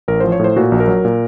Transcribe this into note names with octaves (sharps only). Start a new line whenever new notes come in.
A1 A#4
F3 C5
C#5
A2 C5
A#2 F#4
A#1
A#4
F#3
A#2